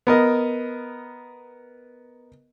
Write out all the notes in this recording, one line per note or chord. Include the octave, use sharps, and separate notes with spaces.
B3 A#4 D#5